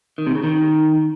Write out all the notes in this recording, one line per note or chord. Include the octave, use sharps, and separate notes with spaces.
D#3
C3
C#3
D#3